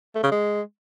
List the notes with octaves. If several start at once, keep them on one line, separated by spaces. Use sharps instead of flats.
A3
C#3
G#3